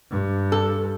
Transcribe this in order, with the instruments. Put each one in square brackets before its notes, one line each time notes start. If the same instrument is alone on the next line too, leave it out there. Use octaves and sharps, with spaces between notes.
[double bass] G2
[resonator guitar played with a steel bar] A4